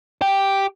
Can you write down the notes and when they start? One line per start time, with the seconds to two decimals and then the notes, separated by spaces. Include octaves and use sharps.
0.22 G4